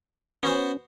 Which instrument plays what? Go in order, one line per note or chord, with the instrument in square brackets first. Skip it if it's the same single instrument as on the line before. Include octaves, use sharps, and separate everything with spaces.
[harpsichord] B3 F#4 C5 [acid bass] C#4